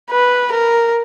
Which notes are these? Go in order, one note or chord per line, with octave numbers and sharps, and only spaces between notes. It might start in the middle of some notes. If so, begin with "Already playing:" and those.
B4
A#4